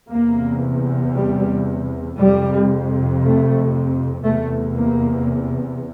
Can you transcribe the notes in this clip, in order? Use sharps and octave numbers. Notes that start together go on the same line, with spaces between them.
E2 C3 A#3
G3
F2 C3 G3
A3
E2 C3 A3
A#3